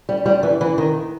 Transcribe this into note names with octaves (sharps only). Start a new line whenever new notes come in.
G3
G3
E3
E3
D#3